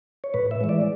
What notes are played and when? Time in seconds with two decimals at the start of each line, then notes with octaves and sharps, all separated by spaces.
0.24 C#5
0.34 A2 B4
0.51 E5
0.61 E3 G#3
0.69 D5